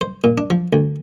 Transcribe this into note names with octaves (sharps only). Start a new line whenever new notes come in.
C5
A#2
D4
F3
D2